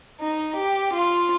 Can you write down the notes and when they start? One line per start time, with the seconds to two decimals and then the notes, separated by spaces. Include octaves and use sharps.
0.21 D#4
0.57 G4
0.94 F4